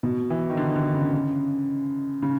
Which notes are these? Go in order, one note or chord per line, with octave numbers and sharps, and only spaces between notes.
B2
E3
D#3
D3
D3
C#3
C#3